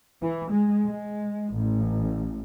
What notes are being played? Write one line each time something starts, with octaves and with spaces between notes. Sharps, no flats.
E3
G#3
G#3
A1